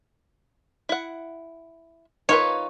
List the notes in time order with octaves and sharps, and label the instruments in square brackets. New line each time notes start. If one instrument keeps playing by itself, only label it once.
[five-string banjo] E4 F#5
[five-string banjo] D#4 F4 B4 [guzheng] C#5